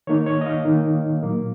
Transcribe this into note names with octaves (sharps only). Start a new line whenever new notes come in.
D#3 A#3 D#4 C#5
C#5
D#5
F5
D#3 A#3 D#4
A#2 F#3 A#3